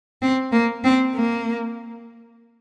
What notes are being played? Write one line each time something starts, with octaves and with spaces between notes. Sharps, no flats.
C4
A#3
C4
A#3